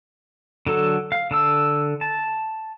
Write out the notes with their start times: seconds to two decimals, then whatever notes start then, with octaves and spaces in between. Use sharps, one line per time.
0.67 D3 F#3 A4
1.12 F5
1.31 D3 A5 E6
2.01 A5